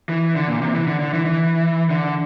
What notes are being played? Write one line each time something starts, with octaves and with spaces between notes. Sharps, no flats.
E3
D3
A#2
C3
E3
D3
D3
E3
E3
D3